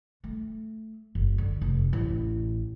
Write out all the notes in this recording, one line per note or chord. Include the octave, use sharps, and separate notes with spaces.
A3
F#1
D3
F1
A1